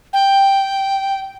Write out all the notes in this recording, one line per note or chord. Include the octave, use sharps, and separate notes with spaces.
G5